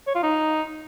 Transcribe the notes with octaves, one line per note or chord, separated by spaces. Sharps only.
C#5
F4
D#4